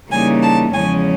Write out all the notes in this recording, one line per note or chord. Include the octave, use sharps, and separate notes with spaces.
C#3 E3 G3 A#3 D#4 G#5
A5
E2 C#3 F3 G#3 C#4 G#5